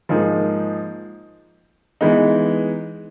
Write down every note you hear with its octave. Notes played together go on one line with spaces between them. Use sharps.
G#2 F3 A#3 D#4 G#4
E3 G#3 B3 D#4